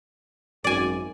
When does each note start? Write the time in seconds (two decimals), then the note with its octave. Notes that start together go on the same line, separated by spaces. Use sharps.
0.64 G#1 F#2 D5 G#5